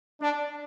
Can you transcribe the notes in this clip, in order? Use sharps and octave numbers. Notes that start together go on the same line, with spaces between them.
D4